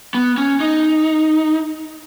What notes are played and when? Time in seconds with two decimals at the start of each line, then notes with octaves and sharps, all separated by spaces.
0.15 B3
0.38 C#4
0.60 D#4